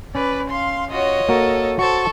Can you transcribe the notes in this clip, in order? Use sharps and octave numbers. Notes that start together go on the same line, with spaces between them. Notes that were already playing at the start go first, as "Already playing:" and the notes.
C#4 B4 D5
F5 C6
F4 F#4 C#5 D#5
A#3 F#4 A4 A#4
F#4 A4 C5 A5 C#6